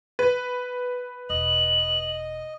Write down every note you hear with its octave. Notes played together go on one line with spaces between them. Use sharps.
B4
E1 D#5 F#7